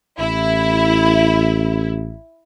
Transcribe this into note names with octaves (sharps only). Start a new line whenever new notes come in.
A1 E4